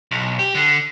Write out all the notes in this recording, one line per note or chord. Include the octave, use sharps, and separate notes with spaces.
B1
G4
D3